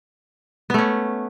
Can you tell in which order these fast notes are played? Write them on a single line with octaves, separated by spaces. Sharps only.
B3 A3 C#4